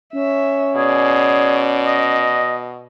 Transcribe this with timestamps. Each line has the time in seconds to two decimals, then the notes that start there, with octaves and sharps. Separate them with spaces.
0.14 C#4 E5
0.76 B2 G#4 D5
1.87 D#5